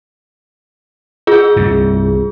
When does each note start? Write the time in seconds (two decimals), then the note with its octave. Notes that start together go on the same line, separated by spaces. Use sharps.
1.27 F4 G#4
1.56 C2 G2